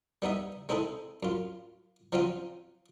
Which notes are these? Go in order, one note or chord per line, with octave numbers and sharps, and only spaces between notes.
G3 B3 D#4 E5
G#3 C4 D#4 E4 A4
F#2 F4
F3 F#3 C4 C#4 F4